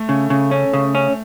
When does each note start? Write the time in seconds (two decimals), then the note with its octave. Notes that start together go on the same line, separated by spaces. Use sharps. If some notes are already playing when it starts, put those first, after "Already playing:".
Already playing: A3
0.09 C#3
0.30 C#3
0.51 C#4
0.74 C#3
0.95 C#4